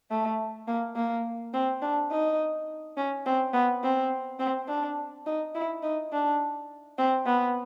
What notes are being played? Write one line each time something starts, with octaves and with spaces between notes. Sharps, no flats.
A3
A#3
A#3
C4
D4
D#4
C#4
C4
B3
C4
C4
D4
D#4
E4
D#4
D4
C4
B3